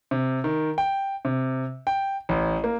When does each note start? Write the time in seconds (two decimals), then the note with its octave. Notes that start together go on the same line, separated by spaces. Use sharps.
0.11 C3
0.44 D#3
0.78 G5
1.25 C3
1.87 G5
2.29 A1
2.64 A#3